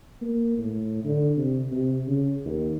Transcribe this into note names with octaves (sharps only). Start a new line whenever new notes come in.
A#3
A2
D3
C3
C3
C#3
D#2